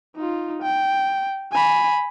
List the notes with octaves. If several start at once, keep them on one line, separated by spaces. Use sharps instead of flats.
D#4 F4
G5
G#5 B5